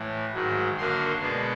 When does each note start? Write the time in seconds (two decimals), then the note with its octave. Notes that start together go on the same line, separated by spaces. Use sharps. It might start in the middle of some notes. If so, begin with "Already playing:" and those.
Already playing: A2 E3
0.34 G#2 D#3 F#3
0.77 F#2 D3 F#3 A#3 D4 C6
1.21 B2 G#3 B3 D4